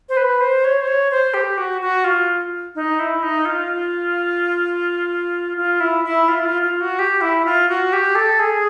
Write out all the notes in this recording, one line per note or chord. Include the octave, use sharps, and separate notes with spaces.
C5
B4
C5
C#5
C5
C#5
C5
G4
F#4
F#4
F4
D#4
E4
D#4
F4
F4
E4
E4
F4
E4
F4
F4
F#4
G4
E4
F4
F#4
G4
A4
G#4